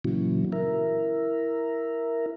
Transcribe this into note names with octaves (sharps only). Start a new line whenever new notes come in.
A#2 C#3 E3 F#3
E4 A#4